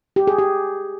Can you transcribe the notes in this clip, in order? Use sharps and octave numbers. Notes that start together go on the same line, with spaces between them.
G4
G#4
G4